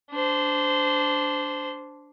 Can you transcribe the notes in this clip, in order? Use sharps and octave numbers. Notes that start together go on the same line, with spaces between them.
D4 C5